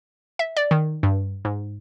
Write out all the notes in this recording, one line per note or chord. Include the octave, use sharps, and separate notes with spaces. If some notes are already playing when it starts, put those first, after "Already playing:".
E5
D5
D#3
G2
G#2